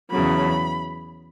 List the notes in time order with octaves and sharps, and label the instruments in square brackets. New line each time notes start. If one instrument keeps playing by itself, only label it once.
[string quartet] E2 C#3 F#3 B5